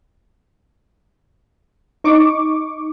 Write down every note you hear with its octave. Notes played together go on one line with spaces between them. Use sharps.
D#4 C#6 D6